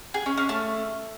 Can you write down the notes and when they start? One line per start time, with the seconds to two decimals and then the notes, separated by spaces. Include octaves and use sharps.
0.14 G#4
0.26 C#4
0.37 C#4
0.49 A3